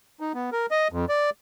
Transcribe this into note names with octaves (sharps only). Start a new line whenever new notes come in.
D#4
B3
A#4
D#5
F2
D5